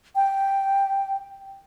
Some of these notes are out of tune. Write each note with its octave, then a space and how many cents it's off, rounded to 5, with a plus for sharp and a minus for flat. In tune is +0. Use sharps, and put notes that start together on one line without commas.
G5 +0